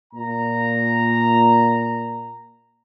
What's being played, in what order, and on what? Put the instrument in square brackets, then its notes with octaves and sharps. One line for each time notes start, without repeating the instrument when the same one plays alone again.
[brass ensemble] A#2 A#5